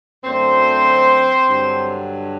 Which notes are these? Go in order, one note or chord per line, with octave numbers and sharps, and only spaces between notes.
F#2 D3 F#3 A3 C4 C5
G2 D3 F#3